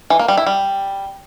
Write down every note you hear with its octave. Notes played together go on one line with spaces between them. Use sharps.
E3
A#3
G3
E4
G3